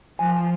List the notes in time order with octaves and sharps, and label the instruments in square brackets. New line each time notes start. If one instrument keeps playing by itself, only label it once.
[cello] F3 [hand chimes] G#5